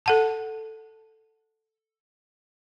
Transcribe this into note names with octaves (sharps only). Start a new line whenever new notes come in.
A4 F#5 A5